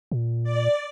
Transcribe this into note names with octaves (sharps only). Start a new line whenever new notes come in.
A#2
D5